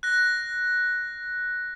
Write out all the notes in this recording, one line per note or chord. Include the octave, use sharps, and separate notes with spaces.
F#6 A#6